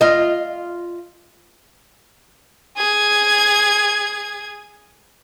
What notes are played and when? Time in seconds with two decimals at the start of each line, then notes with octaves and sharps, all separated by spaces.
0.01 F4 D#5
2.77 G#4 G#6